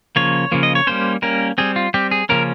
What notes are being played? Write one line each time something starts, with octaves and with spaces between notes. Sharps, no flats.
C#3 F3 A#3 C#5
C#3 F3 A#3
D#5
C#5
G3 A#3 C#4 C5
G3 A#3 C#4 A#4
G3 C4 G#4
F4
G3 C4 G4
G#4
C#3 F3 A#3 C#4 A#4